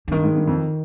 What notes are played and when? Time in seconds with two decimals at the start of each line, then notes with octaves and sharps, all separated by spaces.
0.08 D3
0.11 G2 D#3
0.24 G#2
0.35 G2
0.47 F2